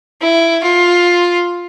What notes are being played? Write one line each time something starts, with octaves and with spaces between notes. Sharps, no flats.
E4
F4